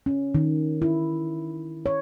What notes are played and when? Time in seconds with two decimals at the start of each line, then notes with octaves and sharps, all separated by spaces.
0.06 C#4
0.35 D#3
0.82 E4
1.86 C#5